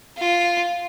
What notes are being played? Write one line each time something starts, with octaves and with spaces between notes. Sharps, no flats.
F4